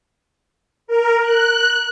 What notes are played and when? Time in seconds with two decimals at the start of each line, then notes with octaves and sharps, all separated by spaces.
0.87 A#4
1.22 F#6